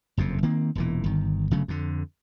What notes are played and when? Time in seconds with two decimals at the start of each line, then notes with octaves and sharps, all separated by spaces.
0.17 F#1 F2 C3
0.43 D#3 A#3 C4
0.75 E1 A#2 E3
1.04 G1 D#3
1.51 G1 C#3 F#3 A3
1.68 F2 D3